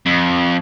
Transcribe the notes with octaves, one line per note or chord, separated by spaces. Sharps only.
F2